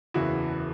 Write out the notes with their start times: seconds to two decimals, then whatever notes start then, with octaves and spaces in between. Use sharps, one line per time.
0.14 F#1 E2 C#3 E4 F#4